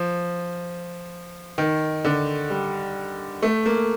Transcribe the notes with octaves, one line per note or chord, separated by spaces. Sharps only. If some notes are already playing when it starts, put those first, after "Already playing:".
Already playing: F3
D#3
D3
G3
A3
A#3